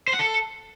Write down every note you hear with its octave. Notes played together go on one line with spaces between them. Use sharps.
C5
F#5
A4